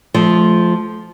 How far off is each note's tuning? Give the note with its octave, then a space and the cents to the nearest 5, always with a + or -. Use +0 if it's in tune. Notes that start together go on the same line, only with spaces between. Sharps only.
F3 +0 A3 -30